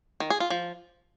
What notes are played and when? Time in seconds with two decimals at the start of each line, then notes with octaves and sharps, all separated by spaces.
0.20 D#3
0.30 G#4
0.40 F4
0.50 F3